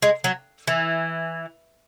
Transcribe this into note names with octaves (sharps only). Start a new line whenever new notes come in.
G#3
F#3
E3